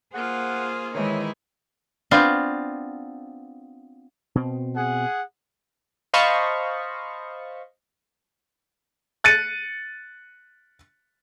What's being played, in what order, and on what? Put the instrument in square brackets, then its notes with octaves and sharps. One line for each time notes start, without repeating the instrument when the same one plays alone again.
[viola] A#3 F4 [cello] G#4 C5 [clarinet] F#5
[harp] D#3 E3 G#3 [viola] D#4 E4 [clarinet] C#5
[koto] B3 C4 D4 F4
[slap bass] B2 C4
[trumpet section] G#4 F#5
[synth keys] C5 D#5 F5 A5 B5 C#6
[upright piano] F#6 A6 C#7 D#7